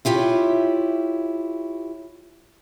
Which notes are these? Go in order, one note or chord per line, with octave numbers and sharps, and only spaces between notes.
E4 F4 G4 C#5